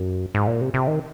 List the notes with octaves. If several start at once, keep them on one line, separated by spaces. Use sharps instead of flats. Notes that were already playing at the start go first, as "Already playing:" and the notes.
Already playing: F#2
G#2
A#2
C3
C3
D#3